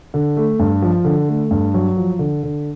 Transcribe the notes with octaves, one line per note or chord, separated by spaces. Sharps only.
D3
A3
G2
F3
D3
A3
G2
F#3
F3
D3
D3